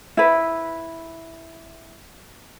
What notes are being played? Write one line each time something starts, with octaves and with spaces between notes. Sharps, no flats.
E4 B4